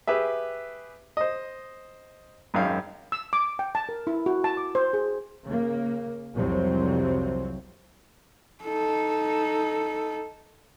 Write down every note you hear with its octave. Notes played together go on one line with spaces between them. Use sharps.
G4 G#4 B4 E5
C5 D#5
G#1 F#2 D#3 F5
E6
D6
G5
A5
A#4
E4
F#4
A5
D6
C5
G#4
C#3 A#3
C2 F2 C3 F#3 C4
D#4 A4